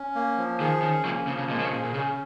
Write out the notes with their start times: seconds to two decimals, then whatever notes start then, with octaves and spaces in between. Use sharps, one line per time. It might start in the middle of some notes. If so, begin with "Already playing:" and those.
Already playing: C#4
0.15 A#3
0.38 F3
0.60 D#3 G#4
0.82 D#3 C#4
1.05 C#3 F3 A#3
1.27 C#3 F3
1.38 C#3
1.49 A#2 G#3
1.59 C#3
1.68 A#2
1.71 G#4
1.85 A#2
1.94 C#3 C#4